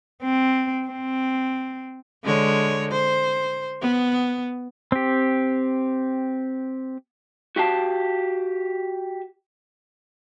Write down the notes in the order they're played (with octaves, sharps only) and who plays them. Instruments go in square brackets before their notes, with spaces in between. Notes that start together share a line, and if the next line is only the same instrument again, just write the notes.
[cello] C4
C4
[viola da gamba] D3 G#3 C#5
C5
B3
[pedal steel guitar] C4 G4
[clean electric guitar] F#4 G4 F5 A5